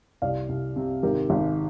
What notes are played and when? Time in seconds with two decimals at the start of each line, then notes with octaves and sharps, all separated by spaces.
0.22 C2 D5 F5
0.49 C2
0.76 C3
1.03 G#1 G4 A#4
1.30 G#1